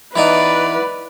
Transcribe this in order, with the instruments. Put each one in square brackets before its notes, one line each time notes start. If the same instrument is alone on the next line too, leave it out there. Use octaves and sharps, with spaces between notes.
[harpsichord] E3 D#4 [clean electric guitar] E4 F#5 [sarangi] B4 [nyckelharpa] D5